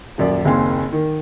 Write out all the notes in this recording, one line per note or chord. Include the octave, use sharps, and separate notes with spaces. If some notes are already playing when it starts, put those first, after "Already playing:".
D#1 F#2 D5
F#1 D#2 C4 F5 G#5 C6
D#3